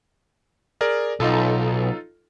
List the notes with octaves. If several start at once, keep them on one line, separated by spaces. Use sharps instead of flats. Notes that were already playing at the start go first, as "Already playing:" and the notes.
G#4 A#4 D5
B1 D#4 F4 A4